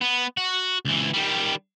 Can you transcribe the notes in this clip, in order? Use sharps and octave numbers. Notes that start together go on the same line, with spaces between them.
B3
F#4
C#2 E3
D#3 G3